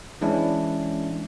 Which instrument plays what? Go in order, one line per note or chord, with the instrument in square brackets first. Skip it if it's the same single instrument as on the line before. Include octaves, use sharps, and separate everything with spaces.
[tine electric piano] E3 G#3 C#4 D4 E4